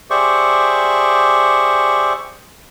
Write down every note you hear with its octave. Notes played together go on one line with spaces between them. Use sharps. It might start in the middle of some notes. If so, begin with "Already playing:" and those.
G4 G#4 C5 D5 E5 C#6